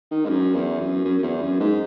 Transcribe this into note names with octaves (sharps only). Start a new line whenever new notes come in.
D#3
G#2
F#2
E2
F#2
F#2
F#2
E2
F#2
G#2